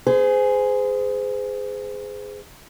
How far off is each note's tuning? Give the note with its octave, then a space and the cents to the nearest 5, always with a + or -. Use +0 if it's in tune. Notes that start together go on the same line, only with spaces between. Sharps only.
G#4 +0 C5 -35